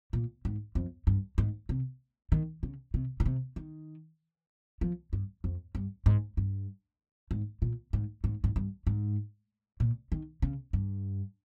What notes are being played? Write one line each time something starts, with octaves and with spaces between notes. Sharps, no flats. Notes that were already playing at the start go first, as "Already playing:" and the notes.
A#2
G#2
F2
G2
G#2
C3
D#3
C#3
C3
A#2
C3
D#3
F3
G2
F2
G2
G#2
G2
G#2
A#2
G#2
G#2
G#2
G2
G#2
A#2
D#3
C#3
G2